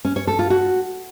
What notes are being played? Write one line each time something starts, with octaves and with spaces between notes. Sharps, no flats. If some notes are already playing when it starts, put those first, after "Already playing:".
C#4
C#5
A4
F4
F#4